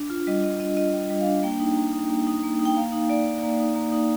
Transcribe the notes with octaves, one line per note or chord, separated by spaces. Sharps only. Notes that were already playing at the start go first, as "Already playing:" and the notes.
Already playing: D4
F4
G3 D#5
G3 D#5
D4 D#5
F4 D#5
G3
G3
F5
D4
A#3 G5
D#4
A#3
D#4
A#3
D#4
A#3
D#4
G5
A#3 F5
D#4
A#3 D5
D#4
A#3
D#4
A#3
D#4